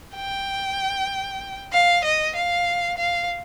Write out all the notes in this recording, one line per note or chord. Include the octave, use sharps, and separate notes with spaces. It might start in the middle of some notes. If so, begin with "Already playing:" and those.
G5
F5
D#5
F5
F5